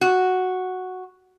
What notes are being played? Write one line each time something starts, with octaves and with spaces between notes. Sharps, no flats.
F#4